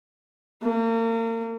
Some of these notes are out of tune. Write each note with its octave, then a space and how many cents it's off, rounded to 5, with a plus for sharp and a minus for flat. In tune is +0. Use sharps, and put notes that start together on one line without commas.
A#3 -35